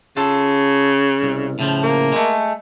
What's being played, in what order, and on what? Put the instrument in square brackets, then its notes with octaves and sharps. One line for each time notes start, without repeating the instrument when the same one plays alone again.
[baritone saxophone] C#3 [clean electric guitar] F4 A4
[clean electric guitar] C2
A2 C#3 F3
[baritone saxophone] A#3
[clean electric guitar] G#3 A3